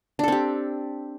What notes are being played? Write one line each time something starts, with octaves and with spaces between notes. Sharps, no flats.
C4 D4 G4 A4